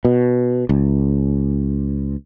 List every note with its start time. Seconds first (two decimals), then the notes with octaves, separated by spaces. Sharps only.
0.05 B2
0.69 C#2